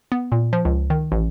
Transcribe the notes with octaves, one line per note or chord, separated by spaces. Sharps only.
B3
A#2
F3
C#2
D#3
A1